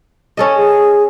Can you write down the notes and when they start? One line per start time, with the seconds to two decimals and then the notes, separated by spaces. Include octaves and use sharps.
0.37 C#4 A4 D#5
0.57 G#4